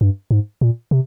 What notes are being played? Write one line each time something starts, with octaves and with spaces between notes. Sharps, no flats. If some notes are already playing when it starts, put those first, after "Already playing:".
G2
G#2
A#2
C3